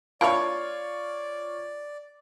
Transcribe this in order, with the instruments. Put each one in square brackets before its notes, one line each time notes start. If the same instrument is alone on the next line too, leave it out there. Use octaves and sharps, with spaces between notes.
[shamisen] A#3 D4 E4 [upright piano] F4 C#5 [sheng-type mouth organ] D5 [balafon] F5